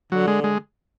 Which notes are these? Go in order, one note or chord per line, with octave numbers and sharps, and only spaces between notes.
D3 F#3
G#3
G#3